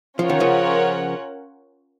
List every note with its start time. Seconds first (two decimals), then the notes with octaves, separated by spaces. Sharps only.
0.19 F3 C#4 F4 A#4 C#5 F#5
0.30 D#3
0.40 C#3 F3